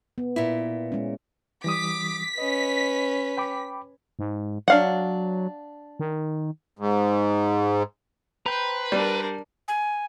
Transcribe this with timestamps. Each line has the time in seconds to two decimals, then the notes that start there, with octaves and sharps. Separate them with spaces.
0.18 B3
0.36 A#2 E4
0.92 G#3 C#4
1.64 E3 G3 D6 D#6 B6
2.38 C#4 B4 D#5
3.37 G5 B5 D6
4.19 G#2
4.68 F#3 D4 F5 F#5
6.00 D#3
6.79 G#2
8.46 B4 C5 G5 A#5
8.92 G3 D4 A#4
9.68 G#5